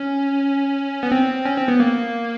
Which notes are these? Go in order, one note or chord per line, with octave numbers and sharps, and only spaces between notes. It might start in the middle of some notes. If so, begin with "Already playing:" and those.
Already playing: C#4
B3
C4
C#4
C4
B3
A#3